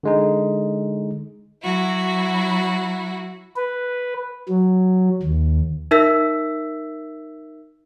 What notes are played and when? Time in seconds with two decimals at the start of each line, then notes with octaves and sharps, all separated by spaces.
0.03 D3 G#3 D#4
1.63 F#3 E4 F#4
3.56 B4
4.49 F#3
5.23 D#2
5.91 D#4 A#4 E5 E6 G6 B6